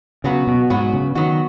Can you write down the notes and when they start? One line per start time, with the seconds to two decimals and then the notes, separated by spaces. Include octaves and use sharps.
0.24 C#3 F#3 B3 F#4
0.47 B2
0.70 G#2 F#3 B3 F#4
0.93 C#3
1.15 D#3 F#3 B3 F#4